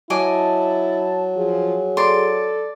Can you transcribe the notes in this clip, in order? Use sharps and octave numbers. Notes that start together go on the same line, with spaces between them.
F#3 E4 D#5 G#5 A5 D6
F3 G#4
A4 D5 C6